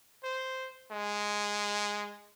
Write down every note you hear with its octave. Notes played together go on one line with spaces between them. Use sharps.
C5
G#3